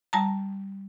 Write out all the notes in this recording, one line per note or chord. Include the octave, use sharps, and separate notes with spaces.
G3 A5 A#5